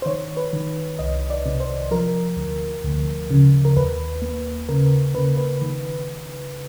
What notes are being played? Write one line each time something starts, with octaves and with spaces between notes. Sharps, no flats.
C5
D#3 C#5
B4
D#3
C2 D#5
D5
C3
C5
F3 A#4
D2
D2
C#3
A#4
D#2 B4
A#3
C#3 A#4
C#3 B4
B4
D#3